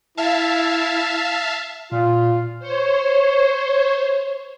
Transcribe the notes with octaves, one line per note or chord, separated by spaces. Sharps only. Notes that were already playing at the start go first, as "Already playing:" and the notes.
E4 E5 F5 A5
A#2 F4
C5 C#5